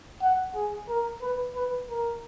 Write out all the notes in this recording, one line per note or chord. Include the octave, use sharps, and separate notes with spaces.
F#5
G#4
A#4
B4
B4
A#4